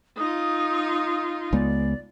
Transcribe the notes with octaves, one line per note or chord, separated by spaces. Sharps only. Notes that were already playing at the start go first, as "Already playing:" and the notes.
D#4 F4 D#6
C#2 G#3 B3 D5